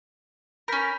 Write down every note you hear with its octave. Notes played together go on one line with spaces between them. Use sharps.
C#4 A#4 B5 G6 B6